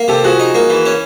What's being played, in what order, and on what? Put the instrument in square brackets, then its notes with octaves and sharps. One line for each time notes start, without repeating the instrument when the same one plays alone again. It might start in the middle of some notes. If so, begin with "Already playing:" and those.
Already playing: [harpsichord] A#3
[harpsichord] C3 [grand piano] G4 A4
[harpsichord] F3 [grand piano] F#4 G#4
[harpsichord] D#4
A#3
E3
C#4